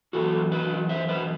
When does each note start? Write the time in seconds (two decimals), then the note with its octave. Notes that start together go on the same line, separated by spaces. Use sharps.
0.13 F#2 E3 F#4 A4
0.52 B4 D#5
0.89 C5 E5
1.09 B4 D#5